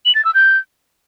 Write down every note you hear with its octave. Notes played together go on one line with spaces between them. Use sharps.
F#7
A6
E6
G6